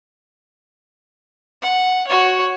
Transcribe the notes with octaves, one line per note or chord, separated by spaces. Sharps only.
F#5
F#4 C#5